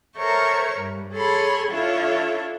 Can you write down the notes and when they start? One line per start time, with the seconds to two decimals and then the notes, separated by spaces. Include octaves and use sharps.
0.16 A4 A#4 C5 C#5 E5 C#6
0.77 G2
1.12 G#4 A4 C#5 B5 C6
1.70 D4 E4 F4 A4 C#5 E5